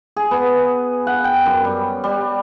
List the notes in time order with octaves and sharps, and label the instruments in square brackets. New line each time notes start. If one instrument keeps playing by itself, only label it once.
[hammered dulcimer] G#4
B3
F#5
G5
F#2
G3
G3